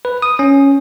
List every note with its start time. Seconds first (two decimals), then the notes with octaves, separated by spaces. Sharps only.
0.05 B4
0.22 D#6
0.39 C#4